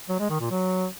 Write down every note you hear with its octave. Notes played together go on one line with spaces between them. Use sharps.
F#3
G#3
D#3
A#2
F#3